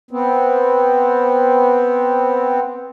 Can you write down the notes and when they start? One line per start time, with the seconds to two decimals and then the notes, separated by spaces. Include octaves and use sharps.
0.11 B3 C4